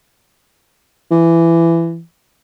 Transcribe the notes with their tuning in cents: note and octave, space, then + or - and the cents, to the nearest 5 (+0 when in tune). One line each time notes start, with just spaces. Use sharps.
E3 +20